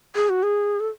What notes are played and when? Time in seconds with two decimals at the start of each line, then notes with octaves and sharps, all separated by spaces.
0.16 G#4
0.29 F#4
0.43 G#4
0.80 A4